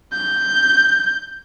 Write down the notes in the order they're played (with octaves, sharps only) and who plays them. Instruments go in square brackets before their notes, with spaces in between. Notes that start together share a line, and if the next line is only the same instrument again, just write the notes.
[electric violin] G6